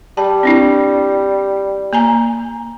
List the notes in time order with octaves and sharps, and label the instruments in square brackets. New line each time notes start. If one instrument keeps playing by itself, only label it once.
[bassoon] G3 [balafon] A5
[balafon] C4 D4 E4
A#3 G#5 A#5